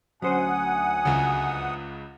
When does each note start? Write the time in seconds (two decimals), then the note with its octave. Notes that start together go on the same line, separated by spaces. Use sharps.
0.22 D2 F#3 C#4 C5 F#5 G#5 D#6
1.05 C#2 C#3